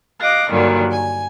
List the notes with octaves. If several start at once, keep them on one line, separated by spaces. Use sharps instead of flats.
D#5 F5 D6 F#6 A#6
G2 A#2 D3 D#3 F#3 G3
G#5